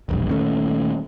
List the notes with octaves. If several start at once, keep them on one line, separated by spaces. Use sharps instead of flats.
E1 A#1 G2
D#1 D#2 A3 C#4